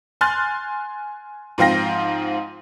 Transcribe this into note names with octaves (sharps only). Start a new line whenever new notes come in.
G#5 C6 F6 F#6 A6
G#2 F3 C4 F5 G5 A#6